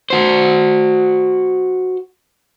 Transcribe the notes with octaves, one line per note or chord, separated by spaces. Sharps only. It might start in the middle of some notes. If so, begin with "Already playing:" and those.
F#4 C5